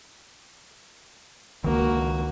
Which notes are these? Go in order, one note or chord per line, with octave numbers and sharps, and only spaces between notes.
C#2 D#3 A#3 F#4